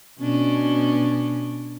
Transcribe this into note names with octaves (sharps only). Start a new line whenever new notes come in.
B2 C#4 D4